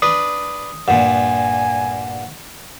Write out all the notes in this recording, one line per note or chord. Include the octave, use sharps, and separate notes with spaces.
D4 B4 D#6
G2 A#2 F#5 G#5